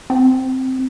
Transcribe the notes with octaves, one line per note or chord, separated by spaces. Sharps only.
C4